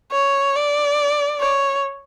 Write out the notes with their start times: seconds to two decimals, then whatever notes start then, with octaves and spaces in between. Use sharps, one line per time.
0.12 C#5
0.56 D5
1.40 C#5